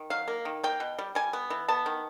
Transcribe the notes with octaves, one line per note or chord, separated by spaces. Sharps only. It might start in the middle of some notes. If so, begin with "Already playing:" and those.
Already playing: D#3
F#3 F5
A#3
D#3
A#3 G5
B2
G3
G3 G#5
B3
E3
B3 A5
D#3